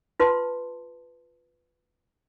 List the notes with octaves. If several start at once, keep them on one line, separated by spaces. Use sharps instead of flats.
F4 B4 A5 C6